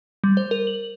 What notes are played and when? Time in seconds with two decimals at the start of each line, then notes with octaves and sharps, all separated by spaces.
0.24 G3
0.37 C5
0.51 A#4
0.67 F#7